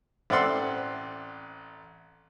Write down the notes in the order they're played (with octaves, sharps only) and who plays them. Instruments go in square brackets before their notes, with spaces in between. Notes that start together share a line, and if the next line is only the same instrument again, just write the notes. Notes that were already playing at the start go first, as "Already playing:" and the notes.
[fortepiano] A1 C4 D5 F#5 C6 E6